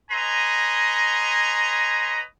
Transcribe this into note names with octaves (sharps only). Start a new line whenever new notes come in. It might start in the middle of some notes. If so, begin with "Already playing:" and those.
B4 C#5 D#5 G#5 A#5 C6